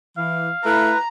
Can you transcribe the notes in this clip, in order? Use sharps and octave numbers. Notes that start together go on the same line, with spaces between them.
E3 F5
A3 E4 B4 A#5